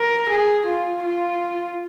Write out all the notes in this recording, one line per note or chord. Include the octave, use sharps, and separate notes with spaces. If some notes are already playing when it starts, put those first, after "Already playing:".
Already playing: A#4
G#4
F4
F4